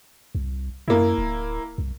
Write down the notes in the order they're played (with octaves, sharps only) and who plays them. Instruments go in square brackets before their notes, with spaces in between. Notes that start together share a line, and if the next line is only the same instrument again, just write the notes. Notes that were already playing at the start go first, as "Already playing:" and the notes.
[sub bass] C2
[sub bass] F#2 [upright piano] A#3 E4
[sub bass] D1
C2